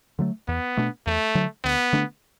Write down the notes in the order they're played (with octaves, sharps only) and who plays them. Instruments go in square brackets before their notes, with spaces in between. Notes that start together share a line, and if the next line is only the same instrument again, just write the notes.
[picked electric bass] D3 F#3 A3
[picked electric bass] E2 [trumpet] B3
[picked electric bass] B2 A3 D4
[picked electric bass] E2 [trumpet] A3
[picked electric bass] D3 F#3
[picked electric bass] D2 [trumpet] B3
[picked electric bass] D3 A3 D4